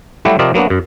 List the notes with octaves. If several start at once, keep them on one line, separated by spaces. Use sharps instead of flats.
F#3 G3 A3 E4 F#4 G4
C3 F3 C4 A#4 D5 D#5
F#3 A#3 B3 D4 F#4
F#2